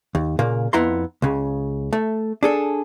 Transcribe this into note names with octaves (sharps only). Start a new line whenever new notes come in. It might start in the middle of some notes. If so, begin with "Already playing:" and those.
D#2
A#2 C#3 A#3
F2 B3 E4 A#5 C6
C#2 C#3
A3
D4 G#4 A4